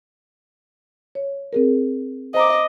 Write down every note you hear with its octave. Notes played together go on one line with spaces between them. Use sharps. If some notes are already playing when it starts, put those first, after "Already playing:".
C#5
C4 G#4 A#4
C5 D#5 A#5 D6